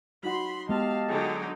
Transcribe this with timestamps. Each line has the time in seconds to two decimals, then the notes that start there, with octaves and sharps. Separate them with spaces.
0.23 F#3 D#4 F#4 B5 C6
0.69 G#3 B3 G4 D#5 F5 A5
1.08 D3 F#3 D#4 G#4